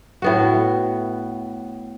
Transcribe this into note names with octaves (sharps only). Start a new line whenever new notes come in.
A2 B3 F#4